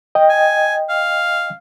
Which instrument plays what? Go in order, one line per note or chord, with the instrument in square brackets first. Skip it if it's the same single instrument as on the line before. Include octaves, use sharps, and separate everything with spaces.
[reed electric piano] D#5 G5
[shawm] G#5
F5